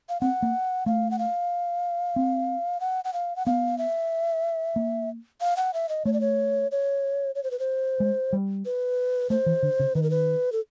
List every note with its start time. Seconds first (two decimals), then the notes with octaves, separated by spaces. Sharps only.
0.09 F5
0.21 C4 F#5
0.42 A#3
0.86 A3 F5
1.11 F#5
1.19 F5
2.16 C4
2.80 F#5
3.05 F#5
3.14 F5
3.36 F#5
3.46 B3 F5
3.78 E5
4.76 A#3
5.41 F5
5.57 F#5
5.74 E5
5.89 D#5
6.05 A3 C#5
6.13 D5
6.21 C#5
6.71 C#5
7.35 C#5
7.44 C5
7.51 B4
7.59 C5
8.00 G#3
8.33 G3
8.65 B4
9.30 A3 C5
9.46 E3
9.63 D3
9.80 C#3
9.95 D#3 B4
10.03 A#4
10.10 B4
10.52 A4